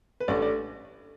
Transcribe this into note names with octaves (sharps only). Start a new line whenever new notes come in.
B4
A1 A2 A3 D4 D5
D5